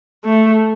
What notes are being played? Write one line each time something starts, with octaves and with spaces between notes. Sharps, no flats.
A3